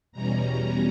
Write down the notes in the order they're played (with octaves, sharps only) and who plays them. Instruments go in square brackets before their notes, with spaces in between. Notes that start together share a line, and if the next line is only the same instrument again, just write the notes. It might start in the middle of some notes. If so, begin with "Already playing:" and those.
[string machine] E2 B2 G3 C#4 A#5